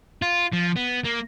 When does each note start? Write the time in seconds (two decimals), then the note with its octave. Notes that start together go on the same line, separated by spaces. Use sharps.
0.22 F4
0.53 F3
0.77 B3
1.05 A#3